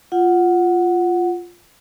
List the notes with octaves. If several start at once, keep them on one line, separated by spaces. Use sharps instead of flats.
F4 F#5